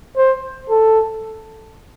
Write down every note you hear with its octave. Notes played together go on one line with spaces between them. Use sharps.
C5
A4